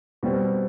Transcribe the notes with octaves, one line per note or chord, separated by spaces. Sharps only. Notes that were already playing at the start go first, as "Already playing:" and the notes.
B2 G3 C4